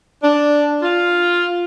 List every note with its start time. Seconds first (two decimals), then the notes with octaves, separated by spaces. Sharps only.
0.22 D4
0.82 F4